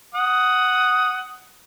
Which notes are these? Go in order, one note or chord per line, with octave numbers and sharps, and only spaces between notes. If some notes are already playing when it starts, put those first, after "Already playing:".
F#5 D#6